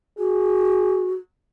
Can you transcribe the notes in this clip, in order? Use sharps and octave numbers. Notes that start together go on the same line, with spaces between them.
F#4 G#4